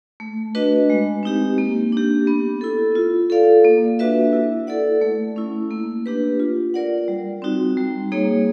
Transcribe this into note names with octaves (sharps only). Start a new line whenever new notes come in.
A3
D4 F#4 B4 D#5
G#3
C4 D#4 G4
A#3
D4 G4
B3
E4 A4
F4
A4 D5 F5
A#3
D4 F#4 B4 E5
E4
A4 D5 F#5
A3
C#4 E4
A#3
D4 G4 B4
F4
A#4 D5 F#5
G3
C4 D#4 F#4
G3
A#3 D#4 G#4 C#5